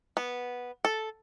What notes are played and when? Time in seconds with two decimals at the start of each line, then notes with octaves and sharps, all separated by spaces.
0.17 B3
0.85 A4